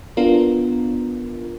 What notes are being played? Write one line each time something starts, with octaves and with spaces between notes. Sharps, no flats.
B3 D4 F4 A#4